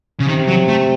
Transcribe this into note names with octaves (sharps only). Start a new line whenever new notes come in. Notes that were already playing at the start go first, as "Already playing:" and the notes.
C#3
C3 D#3
F#3
A3